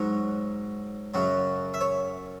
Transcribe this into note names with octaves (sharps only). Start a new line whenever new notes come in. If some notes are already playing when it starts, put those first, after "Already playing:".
Already playing: G#2 F#3 C#5
F#2 C#3 F#3
E5
C#5